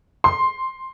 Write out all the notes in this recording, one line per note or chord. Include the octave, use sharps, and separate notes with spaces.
C6